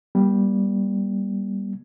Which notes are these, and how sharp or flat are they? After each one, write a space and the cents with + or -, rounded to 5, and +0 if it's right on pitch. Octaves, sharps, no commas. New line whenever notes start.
G3 +0 A#3 +45